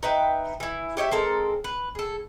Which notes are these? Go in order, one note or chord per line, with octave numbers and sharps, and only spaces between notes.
D#4 B4 E5 G5
E3 E4
G4 C#5 D#5 E5
G#3 C4 A4 A#4
B4
G#4 A4